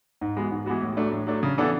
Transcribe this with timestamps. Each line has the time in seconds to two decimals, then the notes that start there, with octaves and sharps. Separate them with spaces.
0.21 G#2
0.36 E3 G#3 B3 F#4
0.51 G#2
0.66 E3 G#3 B3 F#4
0.82 A2
0.97 F#3 A3 D4
1.11 A2
1.27 F#3 A3 D4
1.43 C#3
1.58 E3 B3 D4 A4